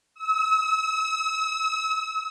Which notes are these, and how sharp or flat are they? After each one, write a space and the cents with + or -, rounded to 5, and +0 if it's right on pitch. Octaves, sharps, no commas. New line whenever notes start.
E6 -40